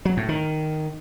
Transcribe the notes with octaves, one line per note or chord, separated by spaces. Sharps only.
F#3
A2
D#3